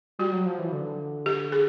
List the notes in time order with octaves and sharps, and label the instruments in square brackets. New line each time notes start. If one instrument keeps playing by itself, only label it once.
[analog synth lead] G3 [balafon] F#4
[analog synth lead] F#3
F3
E3
D3
[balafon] G4
G#4